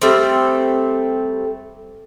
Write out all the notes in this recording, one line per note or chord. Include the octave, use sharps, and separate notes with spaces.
G3 A3 C4